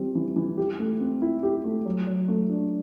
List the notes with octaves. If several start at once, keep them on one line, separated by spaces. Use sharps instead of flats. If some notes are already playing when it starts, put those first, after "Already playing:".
Already playing: E3 G3 C4
E3
E3
G4
A3
C4
E4
G4
A3
F#3
F#3
A3
D4